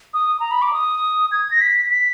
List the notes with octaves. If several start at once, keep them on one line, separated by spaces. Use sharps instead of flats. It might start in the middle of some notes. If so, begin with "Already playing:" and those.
D#6
A#5
B5
D6
D#6
G#6
A#6
B6
B6